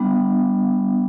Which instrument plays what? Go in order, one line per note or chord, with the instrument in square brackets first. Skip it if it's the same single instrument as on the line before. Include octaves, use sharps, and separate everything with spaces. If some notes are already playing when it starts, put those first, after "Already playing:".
Already playing: [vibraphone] G3 B3 D4